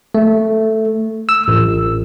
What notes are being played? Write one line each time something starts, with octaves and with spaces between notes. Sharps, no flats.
A3
E6
A1